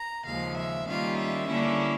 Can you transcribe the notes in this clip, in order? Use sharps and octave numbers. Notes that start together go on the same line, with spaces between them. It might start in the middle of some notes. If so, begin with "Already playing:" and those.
Already playing: A#5
D#2 C#3 F3 G#3 F5
E5
D#3 G3 A#3 C#4 F4 F5
E5
D3 G3 A#3 C#4 E4